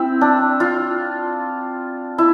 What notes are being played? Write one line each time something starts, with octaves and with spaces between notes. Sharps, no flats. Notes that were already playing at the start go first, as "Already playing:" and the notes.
Already playing: C4 E4
D4
F4
E4